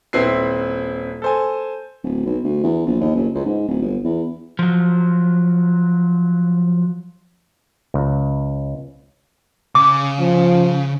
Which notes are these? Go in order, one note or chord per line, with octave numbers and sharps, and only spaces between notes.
D#1 C4 E4 B4 C7
A4 C5 G#5
D1
B1
D2
E2
A#1
D#2
F#1
C#2
G#2
D1
G1
E2
F3 F#3
C#2
C#3 D6
F3